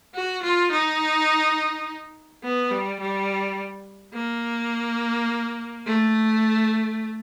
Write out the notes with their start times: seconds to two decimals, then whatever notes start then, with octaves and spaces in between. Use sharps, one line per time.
0.14 F#4
0.43 F4
0.72 D#4
2.43 B3
2.71 G3
3.00 G3
4.14 A#3
5.86 A3